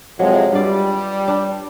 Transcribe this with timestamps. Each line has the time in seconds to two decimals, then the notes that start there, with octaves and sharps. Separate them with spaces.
0.19 F2 C3 F#3 G#3
0.52 G2 G3 F4 D5
1.28 D4